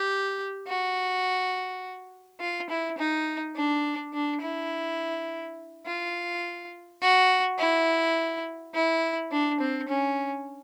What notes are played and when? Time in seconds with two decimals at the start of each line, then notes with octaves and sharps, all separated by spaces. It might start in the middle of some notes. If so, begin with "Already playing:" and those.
Already playing: G4
0.68 F#4
2.40 F4
2.70 E4
2.98 D#4
3.56 D4
4.13 D4
4.42 E4
5.86 F4
7.02 F#4
7.59 E4
8.74 E4
9.32 D4
9.61 C4
9.89 C#4